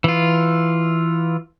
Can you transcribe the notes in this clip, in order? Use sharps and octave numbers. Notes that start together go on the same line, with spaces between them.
E3 F4